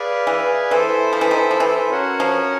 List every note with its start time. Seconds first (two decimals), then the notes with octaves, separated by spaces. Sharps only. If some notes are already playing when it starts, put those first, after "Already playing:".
Already playing: G#4 B4 D5 F5 G#5
0.27 E3
0.71 E3 E4 A4 C5 E5
1.13 F3
1.21 E3
1.31 D#3
1.51 F3
1.60 E3
1.91 C#4 F#4 A#4 C#5 F#5
2.20 F3